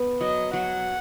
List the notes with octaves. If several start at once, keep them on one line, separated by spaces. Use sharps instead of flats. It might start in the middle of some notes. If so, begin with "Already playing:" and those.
Already playing: B3
F#3 D#5
F#3 F#5